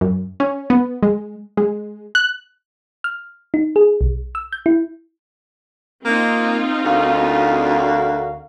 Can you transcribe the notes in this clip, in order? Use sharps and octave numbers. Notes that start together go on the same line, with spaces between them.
F#2
C#4
B3
G#3
G#3
F#6
F6
D#4
G#4
B1
E6
G6
E4
A#3 C4 D#4 F4
D2 F#4 A#4 F5